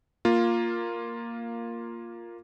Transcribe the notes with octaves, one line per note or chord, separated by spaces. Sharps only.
A#3 F4